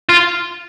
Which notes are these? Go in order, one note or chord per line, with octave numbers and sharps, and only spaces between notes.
F4